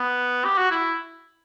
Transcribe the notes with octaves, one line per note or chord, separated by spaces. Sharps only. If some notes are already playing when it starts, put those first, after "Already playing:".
Already playing: B3
G4
F#4
E4